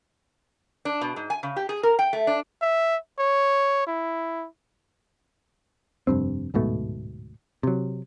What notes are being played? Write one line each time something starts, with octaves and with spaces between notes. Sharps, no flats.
D4
B2
G#2
G#5
C#3
G4
G#4
A#4
G5
A3
D4
E5
C#5
E4
F1 G2 C4
D1 G#2 B2 A3
C3 F#3